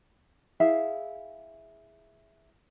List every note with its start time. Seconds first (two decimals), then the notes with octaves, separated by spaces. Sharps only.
0.60 E4 G#4 E5 F5